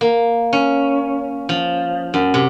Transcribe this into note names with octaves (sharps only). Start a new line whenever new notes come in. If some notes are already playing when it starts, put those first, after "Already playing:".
A#3
C#4
F3
F#2
C3